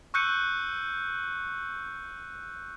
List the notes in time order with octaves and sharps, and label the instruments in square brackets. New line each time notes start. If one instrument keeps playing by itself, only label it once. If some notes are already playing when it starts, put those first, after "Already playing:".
[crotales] C#6 E6 F#6 G6 C#7 D#7